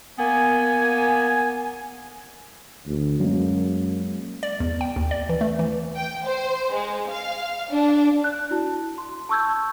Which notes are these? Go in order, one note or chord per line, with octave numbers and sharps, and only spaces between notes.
A#3 B3 G#5
D2
F#2 F#3 G#3 A#3
D5
E2
G5
D#2
D5
E3
A3
E3
G5
C5
G#3
F5
D4
F#6
E4 F#4 A5
C6
A5 C#6 E6 G6 G#6